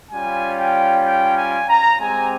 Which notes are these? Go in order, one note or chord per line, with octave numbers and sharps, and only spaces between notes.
G3 C#4 F4 G#5
G5
G5
G#5
A#5
G#3 C4 G4 G#5